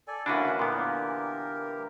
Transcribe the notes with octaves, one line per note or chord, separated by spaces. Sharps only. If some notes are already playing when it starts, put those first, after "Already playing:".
A4 D5 G#5
D3 E3 A#3 C#4 D4 E4 F#4 B4
A#2 B3 G4 A#4